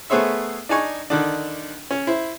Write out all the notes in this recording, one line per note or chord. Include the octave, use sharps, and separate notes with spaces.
A3 B3 G#4 C5 C#5 E5
D4 D#4 G#5 C#6
D3 D#3 D4
C#4
E4 C5